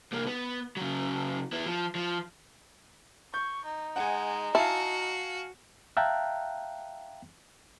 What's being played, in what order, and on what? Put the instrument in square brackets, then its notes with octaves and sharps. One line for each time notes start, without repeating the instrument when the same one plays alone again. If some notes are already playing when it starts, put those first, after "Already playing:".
[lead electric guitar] C2 A#3
B3
C#3 F#3
B3 E4
F3
F3
[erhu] C#6 [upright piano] G6
[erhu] D#4
[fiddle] G#3 [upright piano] F#5 G#5
[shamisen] E4 [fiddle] F#4 [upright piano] F5 G#5 A5
[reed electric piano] E5 F5 G5 A5 A#5 F#6